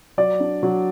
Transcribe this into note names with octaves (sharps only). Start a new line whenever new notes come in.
F#3 D5
D4
F#3